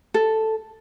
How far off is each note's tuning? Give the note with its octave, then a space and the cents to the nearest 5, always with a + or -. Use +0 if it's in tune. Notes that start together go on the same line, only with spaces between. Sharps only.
A4 +0